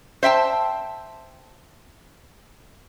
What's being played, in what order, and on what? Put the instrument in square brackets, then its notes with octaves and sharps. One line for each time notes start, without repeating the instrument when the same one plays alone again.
[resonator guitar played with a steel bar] C5 E5 G5 A5